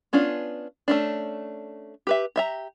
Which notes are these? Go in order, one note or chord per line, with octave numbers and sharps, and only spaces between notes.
B3 C#4 D4 F4
A3 C#4 D4
G4 B4 E5
G4 E5 A#5